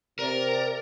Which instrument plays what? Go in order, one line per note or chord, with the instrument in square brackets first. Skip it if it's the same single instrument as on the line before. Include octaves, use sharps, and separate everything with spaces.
[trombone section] C3 [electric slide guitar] A#4 [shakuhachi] D5